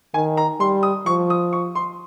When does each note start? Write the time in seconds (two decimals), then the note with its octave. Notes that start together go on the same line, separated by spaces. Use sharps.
0.14 D#3 G#5
0.37 A#5
0.60 G3 C6
0.83 D#6
1.06 F3 C#6
1.30 D#6
1.53 C#6
1.75 C6